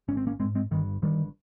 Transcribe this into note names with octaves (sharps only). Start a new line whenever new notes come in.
G#1 G#2 C#4
C4
A#3 C#4
G#1 G#3 C4
G#2
G#3 C4
G1 G2 D#3
G1 G2 D#3 G3